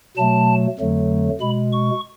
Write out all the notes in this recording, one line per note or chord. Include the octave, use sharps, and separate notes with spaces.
B2 F#3 A3 A5
F2 D3 F#3 A3
B2 G#3 B5
C#6